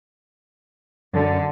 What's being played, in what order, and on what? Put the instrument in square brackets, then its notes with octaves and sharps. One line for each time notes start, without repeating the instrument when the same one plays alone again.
[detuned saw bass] F#2 [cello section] D3